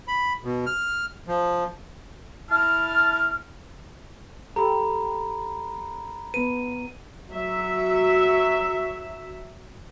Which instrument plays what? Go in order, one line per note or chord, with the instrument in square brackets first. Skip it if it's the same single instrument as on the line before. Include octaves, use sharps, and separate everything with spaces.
[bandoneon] B5
B2
F6
F3
[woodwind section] E4 A5 F6
[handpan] G4 A4 [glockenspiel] A#5 B5
[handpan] B3 B4 [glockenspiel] D#7
[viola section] F#3 E5